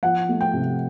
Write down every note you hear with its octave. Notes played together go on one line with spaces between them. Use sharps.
F3 F#5
A3
G5
C3